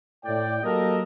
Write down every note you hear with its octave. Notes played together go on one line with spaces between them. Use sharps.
A2 D5 G5
F#3 A#3 G4 A4 A#4 D#5